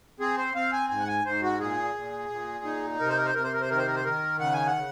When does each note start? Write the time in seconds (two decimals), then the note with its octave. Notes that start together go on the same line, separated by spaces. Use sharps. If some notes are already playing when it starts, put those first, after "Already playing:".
0.20 C4 G#4
0.37 C5
0.55 C4 F5
0.73 G#5
0.90 G#2 G#5
1.00 F#5
1.08 G#5
1.25 G#2 C5
1.43 F#4
1.60 A#2 G#4
1.95 A#2
2.30 A#2
2.65 D#4
3.00 C3 A#4
3.09 C5
3.18 A#4
3.26 C5
3.35 C3 A#4
3.44 C5
3.53 A#4
3.61 C5
3.70 D#3 A#4
3.78 C5
3.87 A#4
3.96 C5
4.05 D#3 A#4
4.39 C#3 F#5
4.53 G#5
4.67 F#5
4.75 C#3